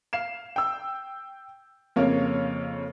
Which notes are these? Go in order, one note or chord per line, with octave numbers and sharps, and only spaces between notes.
F5 C7 E7
G5 E6
F2 C#3 A#3 C#5 F5